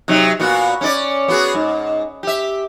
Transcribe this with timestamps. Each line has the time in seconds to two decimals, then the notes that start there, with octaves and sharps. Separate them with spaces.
0.08 C3 F#3 D#4
0.40 A#2 B3 F#4
0.81 C#4 D4 D5
1.28 B3 F#4 G#4
1.54 G#2
2.23 G4 E5